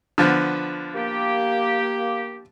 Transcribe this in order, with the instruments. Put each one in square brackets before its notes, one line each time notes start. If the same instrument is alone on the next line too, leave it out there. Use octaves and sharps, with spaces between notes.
[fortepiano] D3 F3 B3
[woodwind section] A#3 G4